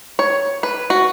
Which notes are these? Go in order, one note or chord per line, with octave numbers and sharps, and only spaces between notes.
C#5
B4
F#4